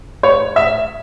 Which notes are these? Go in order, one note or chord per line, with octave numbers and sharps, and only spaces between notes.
C#5
E5